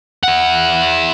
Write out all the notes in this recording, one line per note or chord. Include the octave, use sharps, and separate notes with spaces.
E4 F#5